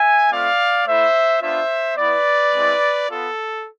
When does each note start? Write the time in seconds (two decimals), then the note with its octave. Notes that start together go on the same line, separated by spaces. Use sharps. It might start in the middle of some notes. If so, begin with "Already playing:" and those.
Already playing: E5 G#5
0.31 A3 C4 F4 D5 F5
0.86 A3 E4 C5 E5
1.42 B3 D4 F4 C5 E5
1.97 B3 E4 B4 D5
2.54 G#3 C4 E4
3.09 B3 F4 A4